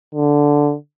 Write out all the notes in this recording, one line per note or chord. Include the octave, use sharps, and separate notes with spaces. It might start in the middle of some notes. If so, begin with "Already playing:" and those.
D3